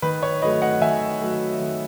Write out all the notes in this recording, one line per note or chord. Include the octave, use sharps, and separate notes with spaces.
D#3 B4
C#5
F#3 A3 B4 D#5
D#5 F#5
D#3 E5 G#5
F#3 A3
D#3